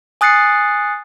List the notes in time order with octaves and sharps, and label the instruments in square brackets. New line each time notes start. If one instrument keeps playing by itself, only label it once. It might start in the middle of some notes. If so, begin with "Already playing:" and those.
[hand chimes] G#5 D#6 F#6 A6 C7 C#7